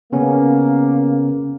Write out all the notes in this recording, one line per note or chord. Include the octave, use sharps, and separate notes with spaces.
C#3 A#3 B3 C#4